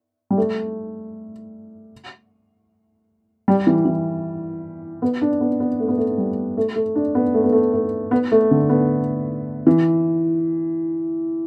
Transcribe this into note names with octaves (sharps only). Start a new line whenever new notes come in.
G3
A3
G3
E3
E3
B3
D4
B3
B3
A3
B3
A3
G3
A3
A3
D4
B3
A3
B3
A3
A3
B3
A3
D3
B3
E3